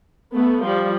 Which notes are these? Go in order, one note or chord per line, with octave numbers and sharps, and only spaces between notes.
A3 B3
F3 G3